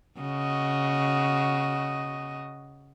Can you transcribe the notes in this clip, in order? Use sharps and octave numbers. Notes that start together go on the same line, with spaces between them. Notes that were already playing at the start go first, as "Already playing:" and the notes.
C#3 F#4 D#5